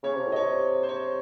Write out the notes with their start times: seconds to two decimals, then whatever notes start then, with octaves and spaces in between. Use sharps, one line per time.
0.03 C#3 C#5
0.15 C3
0.27 A2 D#5
0.36 C3 C#5
0.83 C5
0.89 C#5